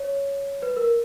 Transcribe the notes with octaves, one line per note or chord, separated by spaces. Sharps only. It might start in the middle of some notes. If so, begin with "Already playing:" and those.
Already playing: C#5
B4
A#4